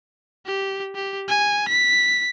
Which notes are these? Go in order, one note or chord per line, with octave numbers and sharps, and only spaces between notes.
G4
G4
G#5
B6